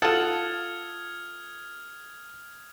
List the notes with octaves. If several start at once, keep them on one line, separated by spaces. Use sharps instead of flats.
F4 A4 F#5 D#6 F6 G#6